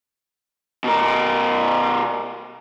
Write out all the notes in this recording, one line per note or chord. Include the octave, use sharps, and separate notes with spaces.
B2 A#4